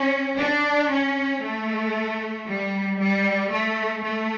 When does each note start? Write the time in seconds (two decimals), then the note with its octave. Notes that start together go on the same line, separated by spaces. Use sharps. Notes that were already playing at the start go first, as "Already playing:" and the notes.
Already playing: C#4
0.38 D4
0.91 C#4
1.43 A3
2.47 G3
2.99 G3
3.51 A3
4.04 A3